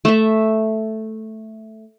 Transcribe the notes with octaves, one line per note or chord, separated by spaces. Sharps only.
A3 E5